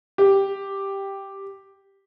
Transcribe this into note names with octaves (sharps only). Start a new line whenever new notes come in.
G4